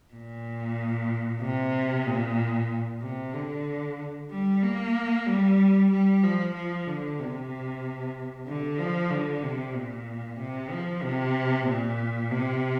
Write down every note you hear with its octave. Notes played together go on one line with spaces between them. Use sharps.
A#2
C3
A#2
C3
D3
G3
A#3
G3
G3
F3
F3
D3
C3
D3
F3
D3
C3
A#2
C3
F3
C3
A#2
C3